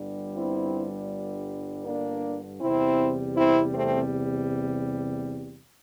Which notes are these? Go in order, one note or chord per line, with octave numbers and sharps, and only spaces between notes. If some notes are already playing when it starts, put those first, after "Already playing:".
Already playing: G1 G2 D3 G3
C4 E4
A#3 D4
E2 C3 G3 C4 E4
C4 E4
A3 C4